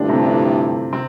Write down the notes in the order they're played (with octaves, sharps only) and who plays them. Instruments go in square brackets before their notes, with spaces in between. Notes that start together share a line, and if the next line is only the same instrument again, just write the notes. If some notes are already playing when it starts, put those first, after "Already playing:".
Already playing: [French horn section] G2 F3 A3 E4 G4 [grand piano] D3 D4
[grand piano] C3 C4
D3 D4
C3 C4